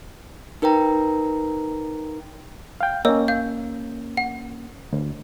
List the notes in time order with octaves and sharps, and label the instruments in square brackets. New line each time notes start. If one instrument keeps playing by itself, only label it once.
[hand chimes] D#4 A#4 B4 G5 A#5
[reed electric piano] F5 G5
[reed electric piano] A#3 C#4 [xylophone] C#5 D#5 E6
[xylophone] F5 G6
F#5
[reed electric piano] D2